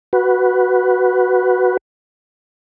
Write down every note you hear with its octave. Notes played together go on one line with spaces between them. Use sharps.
F#4 B4